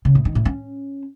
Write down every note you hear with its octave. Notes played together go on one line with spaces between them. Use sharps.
C#3
A2
D#3
A2
C#4